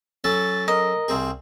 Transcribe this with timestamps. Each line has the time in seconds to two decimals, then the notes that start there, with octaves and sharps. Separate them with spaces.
0.24 F#3 C#4 A4 A6
0.68 A#4 D#5
1.08 C2 C4 G#4